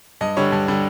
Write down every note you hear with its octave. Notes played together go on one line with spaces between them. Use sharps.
G2 D#5
D3 G3 C#5
G2
D3 G3